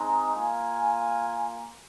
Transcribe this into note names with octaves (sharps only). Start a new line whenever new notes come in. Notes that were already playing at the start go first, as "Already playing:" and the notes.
Already playing: G#3 C4 D#4 A#5
A#3 F4 G#5